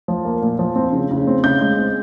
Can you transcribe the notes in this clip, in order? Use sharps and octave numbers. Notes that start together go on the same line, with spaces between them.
F3
A#3
A#2
F3
C4
C#3
C#3
C4
C#3 G6
G#3
C4